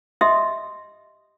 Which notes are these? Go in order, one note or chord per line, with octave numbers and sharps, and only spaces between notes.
G4 D#5 E5 C6 D#6